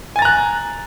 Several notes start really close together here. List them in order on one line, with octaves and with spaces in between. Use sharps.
G#5 A6 A#5 F#6